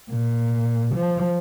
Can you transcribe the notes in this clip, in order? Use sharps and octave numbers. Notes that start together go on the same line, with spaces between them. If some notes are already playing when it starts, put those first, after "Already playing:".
A#2
F3